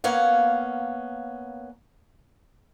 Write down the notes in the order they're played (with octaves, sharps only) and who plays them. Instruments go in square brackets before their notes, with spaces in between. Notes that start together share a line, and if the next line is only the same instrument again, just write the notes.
[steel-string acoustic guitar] A#3 B3 C#4 F5 F#5